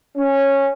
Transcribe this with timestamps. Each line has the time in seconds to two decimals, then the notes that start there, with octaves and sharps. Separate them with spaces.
0.17 C#4